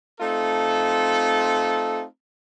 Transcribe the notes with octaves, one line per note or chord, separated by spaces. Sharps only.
A3 C4 D#4 F4 A4